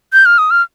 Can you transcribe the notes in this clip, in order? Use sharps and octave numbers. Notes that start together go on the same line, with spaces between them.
G6
F6
D#6
F6